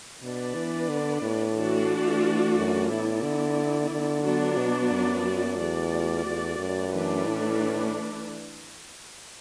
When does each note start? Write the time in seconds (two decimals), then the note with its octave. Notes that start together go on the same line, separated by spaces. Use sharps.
0.22 B2 B3 D4 B4 D5
0.55 E3
0.89 D3
1.22 A2
1.56 E3 A3 D4 F#4 D5
2.56 F#2
2.89 A2 B3 E4 D5
3.23 D3
3.90 D3
4.23 F#3 B3 D4 F#4 D5
4.57 B2
4.91 F#2
5.58 E2 A3 F#4 D5
6.26 E2
6.59 F#2
6.92 E3 A3 D4 B4 D5
7.26 A2